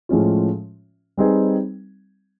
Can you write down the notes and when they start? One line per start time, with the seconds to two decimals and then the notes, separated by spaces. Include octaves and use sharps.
0.09 A2 F3 G#3 C#4 F4
1.17 G3 C4 D#4 G#4 B4